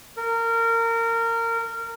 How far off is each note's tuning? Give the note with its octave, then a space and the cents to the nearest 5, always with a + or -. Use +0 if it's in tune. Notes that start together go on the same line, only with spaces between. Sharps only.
A#4 -25